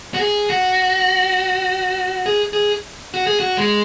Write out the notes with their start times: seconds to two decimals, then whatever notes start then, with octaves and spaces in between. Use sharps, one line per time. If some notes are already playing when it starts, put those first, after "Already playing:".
0.14 F#4
0.21 G#4
0.50 F#4
2.26 G#4
2.53 G#4
3.14 F#4
3.27 G#4
3.40 F#4
3.57 G#3